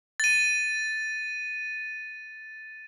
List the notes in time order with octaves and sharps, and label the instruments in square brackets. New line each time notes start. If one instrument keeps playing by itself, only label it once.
[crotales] A6 D#7